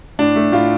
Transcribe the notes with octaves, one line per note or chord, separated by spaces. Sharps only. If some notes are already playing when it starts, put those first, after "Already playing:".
A2 D4
A3
A2 F4